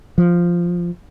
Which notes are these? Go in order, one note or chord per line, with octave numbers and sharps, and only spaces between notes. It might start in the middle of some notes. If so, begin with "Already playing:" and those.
F3